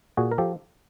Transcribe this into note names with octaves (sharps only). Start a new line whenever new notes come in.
A#2 F#4 G#4
A#4
F3 G4 A4